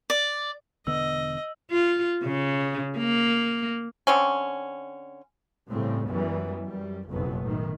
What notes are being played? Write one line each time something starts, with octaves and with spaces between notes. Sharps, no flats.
D5
E1 D3 B3 D#5 E6
F4
C#3
A#3
D3 C4 C#4
A2 C#3 G3 C4
F#2 E3 G3 G#3 B3
F#2 G3
F#1 B1 F2 F#3 B3
A2 D#3